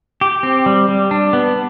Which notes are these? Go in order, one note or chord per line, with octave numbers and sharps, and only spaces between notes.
G4
C4
G3
G3
D4
B3